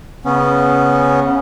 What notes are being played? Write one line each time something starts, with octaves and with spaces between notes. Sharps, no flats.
C#3 B3 C#4